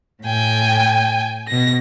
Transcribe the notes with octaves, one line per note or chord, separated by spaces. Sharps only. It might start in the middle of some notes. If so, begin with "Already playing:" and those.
A2 G5 G#5
B2 A#6